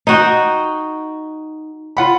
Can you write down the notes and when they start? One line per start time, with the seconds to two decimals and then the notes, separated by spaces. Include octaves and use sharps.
0.07 D#4 F#4 G5
1.97 F4 F#5 B5